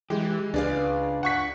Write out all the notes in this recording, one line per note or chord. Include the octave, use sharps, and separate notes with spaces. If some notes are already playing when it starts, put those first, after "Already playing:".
E3 G#3 G4
C#2 D4 G#4 B4 D5 F5
F#5 C#6 B6